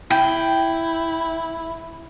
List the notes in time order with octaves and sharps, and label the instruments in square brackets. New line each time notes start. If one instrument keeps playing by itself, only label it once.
[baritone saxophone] E4 [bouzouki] G5